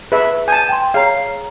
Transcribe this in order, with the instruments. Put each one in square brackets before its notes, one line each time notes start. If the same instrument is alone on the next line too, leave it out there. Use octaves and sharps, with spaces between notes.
[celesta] G#4 [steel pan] B4 E5
[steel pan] G#5 A5 [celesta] G6
[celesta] G5 C6
[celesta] G#4 C#5 A#5 [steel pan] F5